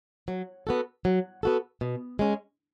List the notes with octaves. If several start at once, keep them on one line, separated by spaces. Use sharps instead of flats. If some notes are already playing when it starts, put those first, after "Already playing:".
F#3
B3 F#4 A4
F#3
B3 F#4 A4
B2
G#3 C#4